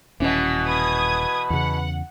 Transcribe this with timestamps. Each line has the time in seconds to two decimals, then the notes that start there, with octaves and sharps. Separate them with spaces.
0.20 D#1 B2 E3 C#4
0.68 B4 D#6 G#6
1.50 E2 C#3 F#5